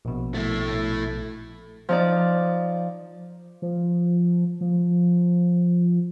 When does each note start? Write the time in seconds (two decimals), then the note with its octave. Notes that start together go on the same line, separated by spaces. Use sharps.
0.05 A#1 B2
0.35 A3 E4
1.89 F3 D#4 D5
3.62 F3
4.61 F3